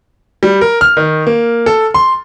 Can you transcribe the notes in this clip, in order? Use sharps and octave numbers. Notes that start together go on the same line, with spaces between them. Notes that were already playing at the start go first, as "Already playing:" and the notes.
G3
A#4
F6
D#3
A#3
A4
C6